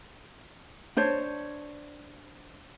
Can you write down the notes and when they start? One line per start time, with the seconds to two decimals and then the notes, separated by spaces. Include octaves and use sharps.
0.97 D4 C5 C#5